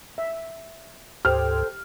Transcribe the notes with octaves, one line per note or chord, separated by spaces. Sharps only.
E5
D2 G#2 G4 A4 C5 G5 F6